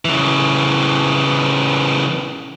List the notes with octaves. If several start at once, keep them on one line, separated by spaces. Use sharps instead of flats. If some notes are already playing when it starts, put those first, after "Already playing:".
C#3 E3